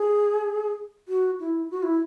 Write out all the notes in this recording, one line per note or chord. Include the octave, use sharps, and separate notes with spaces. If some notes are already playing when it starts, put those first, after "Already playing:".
Already playing: G#4
F#4
E4
F#4
E4